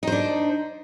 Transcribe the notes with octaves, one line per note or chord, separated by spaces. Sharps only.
D4 D#4 C5